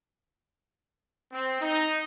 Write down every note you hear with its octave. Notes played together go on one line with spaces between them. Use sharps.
C4
D#4